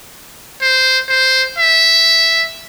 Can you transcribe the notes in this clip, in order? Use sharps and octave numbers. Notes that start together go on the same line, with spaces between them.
C5
C5
E5